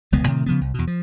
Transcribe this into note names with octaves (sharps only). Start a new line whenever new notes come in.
E1 C#2 G#3 B3
A2 C3 D#3
C#3 F3 B3
C2
E2 B2
F3